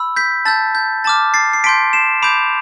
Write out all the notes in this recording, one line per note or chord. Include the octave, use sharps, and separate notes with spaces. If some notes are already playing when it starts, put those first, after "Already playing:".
Already playing: B5 E6
G6 B6
A5 E6 G6 A6
G6
A5 D6 F6 A6
A6 C7
C7
A5 C6 G6 B6 D7
C7 E7
B5 D6 G6 D7 F7